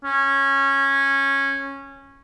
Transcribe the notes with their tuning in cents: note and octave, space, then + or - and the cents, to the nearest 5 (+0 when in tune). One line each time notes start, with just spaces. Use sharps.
C#4 -15